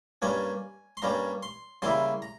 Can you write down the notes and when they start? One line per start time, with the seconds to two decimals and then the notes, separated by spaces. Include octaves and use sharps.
0.22 G2 G3 A#3 C#4 G#5
0.97 C6
1.02 G2 G3 A#3 C#4 A#5
1.43 C6
1.82 C#3 G3 A#3 E4 C6
2.22 A#5